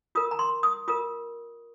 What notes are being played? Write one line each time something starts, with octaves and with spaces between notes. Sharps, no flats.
F4 A#4 D#6
A#5
C6
D#6
F4 A#4 D#6